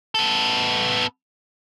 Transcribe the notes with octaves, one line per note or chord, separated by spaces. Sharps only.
B3 A4